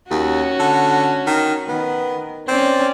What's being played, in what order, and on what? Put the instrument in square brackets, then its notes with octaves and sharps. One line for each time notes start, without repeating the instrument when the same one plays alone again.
[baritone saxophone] D#2 [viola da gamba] C#4 F#4
[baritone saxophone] D3
D#3
[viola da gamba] D#3 [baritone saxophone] B3
[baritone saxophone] C4 [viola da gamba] C#4 D5